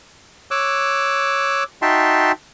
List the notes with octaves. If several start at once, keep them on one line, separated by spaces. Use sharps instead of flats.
C#5 D6 E6 F#6
D#4 F#4 E5 G5 A5 C6